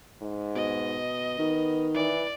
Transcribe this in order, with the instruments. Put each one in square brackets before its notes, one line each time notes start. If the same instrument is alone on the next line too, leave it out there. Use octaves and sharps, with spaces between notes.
[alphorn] G#2
[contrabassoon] B2 [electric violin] D#5
[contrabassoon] D#3 [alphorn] B3
[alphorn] E3 [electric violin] D5